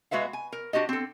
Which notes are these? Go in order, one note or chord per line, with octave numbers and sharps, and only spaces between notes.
G#3 F#4 B4 E5 F5
G#5
A#4
D4 F#4 G4 D#5
C4 A4